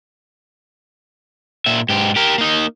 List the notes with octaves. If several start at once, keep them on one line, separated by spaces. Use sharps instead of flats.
A#2 E5
G#2 G4
G4 A#4
A#3 D#4